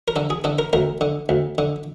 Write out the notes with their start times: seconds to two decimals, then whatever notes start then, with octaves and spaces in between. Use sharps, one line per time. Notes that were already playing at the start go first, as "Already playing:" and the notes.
0.08 A#4
0.16 D3 A4
0.30 G#4
0.44 D3 A4
0.59 A#4
0.73 D2 A#4
1.01 D3
1.29 D2
1.58 D3